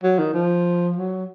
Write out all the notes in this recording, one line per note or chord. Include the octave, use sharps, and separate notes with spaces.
F#3
D#3
F3
F#3